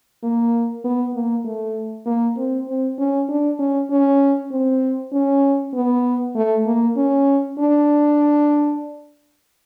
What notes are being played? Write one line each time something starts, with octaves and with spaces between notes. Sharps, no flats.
A#3
B3
A#3
A3
A#3
C4
C4
C#4
D4
C#4
C#4
C4
C#4
B3
A3
A#3
C#4
D4